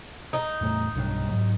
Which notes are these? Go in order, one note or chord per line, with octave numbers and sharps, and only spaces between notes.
D#4
E2 A2 A3
B1 G2 D4
G#2 F#3